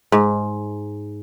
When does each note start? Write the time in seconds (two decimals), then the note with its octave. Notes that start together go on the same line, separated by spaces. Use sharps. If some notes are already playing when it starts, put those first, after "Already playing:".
0.12 G#2